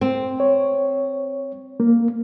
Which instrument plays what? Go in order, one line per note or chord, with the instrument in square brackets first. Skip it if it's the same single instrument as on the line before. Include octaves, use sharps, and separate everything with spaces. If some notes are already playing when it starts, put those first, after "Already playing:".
[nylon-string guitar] C4
[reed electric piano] C#5
A#3